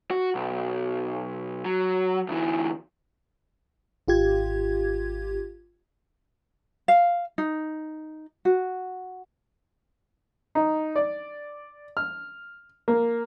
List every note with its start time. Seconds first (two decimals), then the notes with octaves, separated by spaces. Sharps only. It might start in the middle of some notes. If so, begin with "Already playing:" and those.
0.11 F#4
0.35 B1
1.65 F#3
2.28 D2 E3
4.08 G#1 F4 G4 G#6
6.88 F5
7.38 D#4
8.45 F#4
10.55 D#4
10.96 D5
11.97 F6
12.88 A#3